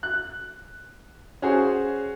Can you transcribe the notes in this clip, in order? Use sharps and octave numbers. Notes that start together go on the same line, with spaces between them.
F#6
C#4 F#4 G#4 C5